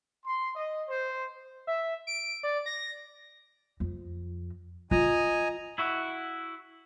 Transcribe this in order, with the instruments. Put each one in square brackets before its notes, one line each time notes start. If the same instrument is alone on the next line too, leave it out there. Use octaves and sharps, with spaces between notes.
[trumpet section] C6
D#5
C5
[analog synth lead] E5
D7
D5
A#6
[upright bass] F2
[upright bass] F4 [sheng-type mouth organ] D#5 G#5 A#5
[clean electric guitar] E4 F#4